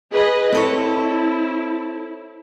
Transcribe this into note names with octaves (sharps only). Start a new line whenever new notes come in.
G#4 B4 D#5
C4 E4 A4 C#5